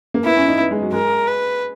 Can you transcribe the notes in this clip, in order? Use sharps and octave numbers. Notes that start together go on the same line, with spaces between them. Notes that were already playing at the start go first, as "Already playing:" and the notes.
A#3
B3 E4
C#4
D#4
B3
G#3
F#3
G#3 A#4
B4